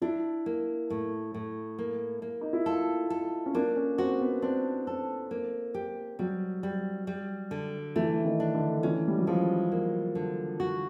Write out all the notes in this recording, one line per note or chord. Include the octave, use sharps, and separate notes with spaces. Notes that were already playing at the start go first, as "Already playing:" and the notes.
D4 E4
A#3
A2
A2
A#3
A#3
D#4
E4
F4 A4
A4
C#4
A#3 D4
C#4
C4 F#4
B3
C4 D4
C4 A4
A#3
G4
F#3 G3
G3
G3
D3
E3 A3
D#3
D4
D3
E3 C#4
G3
F#3
F3 G#3
A#3
D3
F#4